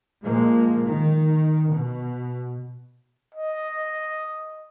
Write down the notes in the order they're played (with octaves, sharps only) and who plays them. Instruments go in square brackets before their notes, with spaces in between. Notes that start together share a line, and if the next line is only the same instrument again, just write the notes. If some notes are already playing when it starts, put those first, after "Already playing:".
[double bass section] A#2 F3 G#3 A#3
D#3
B2
[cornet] D#5